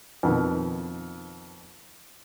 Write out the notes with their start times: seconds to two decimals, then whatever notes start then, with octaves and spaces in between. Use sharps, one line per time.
0.23 F2 B2 D#3